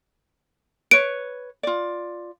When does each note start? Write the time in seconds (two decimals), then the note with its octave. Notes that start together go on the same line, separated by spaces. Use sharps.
0.91 B4 C#5 D7
1.63 F4 D5